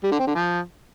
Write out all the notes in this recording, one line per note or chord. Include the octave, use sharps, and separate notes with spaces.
G3
D3
C4
D3
F3